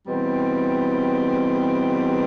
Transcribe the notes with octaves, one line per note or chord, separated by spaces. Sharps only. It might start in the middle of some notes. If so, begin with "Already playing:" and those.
E2 B2 G3 C4